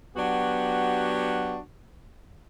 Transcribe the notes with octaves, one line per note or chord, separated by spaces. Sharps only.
F#3 B3 D4 F#4 G4